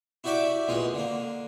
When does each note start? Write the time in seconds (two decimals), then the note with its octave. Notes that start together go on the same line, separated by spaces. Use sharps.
0.24 E4 F#4 G4 D5 E5 D6
0.68 A#1 B2 G#3 F4
0.94 D3 A#3